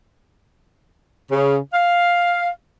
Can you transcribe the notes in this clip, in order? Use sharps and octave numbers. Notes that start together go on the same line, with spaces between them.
C#3
F5